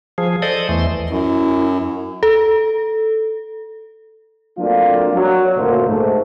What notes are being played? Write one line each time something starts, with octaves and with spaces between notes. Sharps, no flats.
F3 G#4
A4 C5 D5 D#5 D#6
E2 E3 A3 C6
F#2 E4
A4
F#3 A3 A#3 C4 D4 F4
F#3
F#1 D2 A#2 A3 A#3 C5
G#2 A3